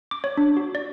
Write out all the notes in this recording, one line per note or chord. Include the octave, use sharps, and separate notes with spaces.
D6
C#5
D4
F#4
D5